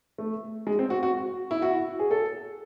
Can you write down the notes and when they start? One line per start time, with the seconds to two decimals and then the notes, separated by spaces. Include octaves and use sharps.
0.18 A3
0.67 G#3
0.79 C4
0.90 F#4
1.03 F#4
1.51 E4
1.62 F#4
1.99 G#4
2.11 A4